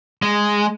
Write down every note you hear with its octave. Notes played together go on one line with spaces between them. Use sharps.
G#3